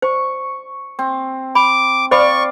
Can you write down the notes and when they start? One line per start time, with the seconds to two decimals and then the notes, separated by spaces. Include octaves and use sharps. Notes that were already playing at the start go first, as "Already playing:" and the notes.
0.02 C5 C#6
0.99 C4
1.55 B5 D6
2.11 C5 D5 F5 B5 C#6